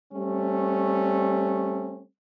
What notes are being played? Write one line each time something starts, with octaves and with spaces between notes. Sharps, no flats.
G3 A3 C4 C#4